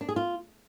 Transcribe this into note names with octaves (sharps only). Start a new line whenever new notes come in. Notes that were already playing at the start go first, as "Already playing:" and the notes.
D4
G#4
F4